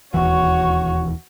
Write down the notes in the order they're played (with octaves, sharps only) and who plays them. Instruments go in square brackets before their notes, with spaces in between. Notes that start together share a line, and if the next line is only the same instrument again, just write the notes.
[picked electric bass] E1 D#2 E3 [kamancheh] F#4 C#5